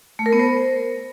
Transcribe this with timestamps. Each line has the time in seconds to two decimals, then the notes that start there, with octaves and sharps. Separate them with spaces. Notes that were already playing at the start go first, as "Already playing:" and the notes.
0.19 A3
0.26 A#4
0.33 B3
0.39 C5